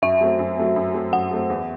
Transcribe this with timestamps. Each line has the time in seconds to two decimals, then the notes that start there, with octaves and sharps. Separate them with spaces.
0.02 F#2 E5
0.21 F#3 A3 C4
0.39 F#2
0.57 F#3 A3 C4
0.76 F#2
0.94 F#3 A3 C4
1.13 F#2 F#5
1.31 F#3 A3 C4
1.50 E2